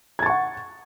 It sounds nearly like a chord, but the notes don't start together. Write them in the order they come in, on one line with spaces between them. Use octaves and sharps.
G#6 A6 C#6 F#5